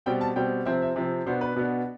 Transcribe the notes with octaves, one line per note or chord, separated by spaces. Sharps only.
B2 G3 C4 G5
A5
B2 G3 C4 G5
C3 F3 C4 E5
E5
C3 F3 C4
B2 B3 D4 C5
B4
B2 B3 D4